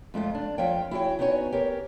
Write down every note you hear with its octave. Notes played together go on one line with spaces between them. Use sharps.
F2 G#3 A3 F4
D4
F2 F3 C#5 F5 G5
E4 F#4 G#4 C#5 G5
B3 D#4 E4 F#4 C#5 G#5
G4 A#4 C#5